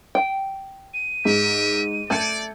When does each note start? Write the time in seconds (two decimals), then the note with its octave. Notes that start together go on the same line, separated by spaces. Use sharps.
0.15 G5
0.94 D#7
1.25 G#2 G4 A#4 E5
2.10 A3 D5 A5 G6 G#6 C#7